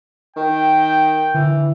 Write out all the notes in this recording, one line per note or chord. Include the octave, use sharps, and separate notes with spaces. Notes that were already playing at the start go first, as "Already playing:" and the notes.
D#3 G5
D3 E3